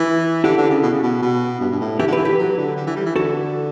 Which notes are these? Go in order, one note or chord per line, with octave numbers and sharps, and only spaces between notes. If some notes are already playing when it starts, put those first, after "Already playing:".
Already playing: E3 B4
D3 E4 G4
D3
C#3
B2
C#3
B2
B2
G2
G2
A2
E3 E4 G4
D3
G4 B4
E3
G4 B4
F#3
D3
D3
E3
G3
E3
D3 F#4 A4